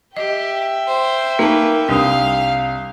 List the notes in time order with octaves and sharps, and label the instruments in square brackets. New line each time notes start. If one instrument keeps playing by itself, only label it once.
[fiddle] G4 [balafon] D#5 [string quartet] E5 G5
[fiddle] C5
[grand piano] A#3 [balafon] D#4 A5 [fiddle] B4
[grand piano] C2 D#6 [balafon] D4 [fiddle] F5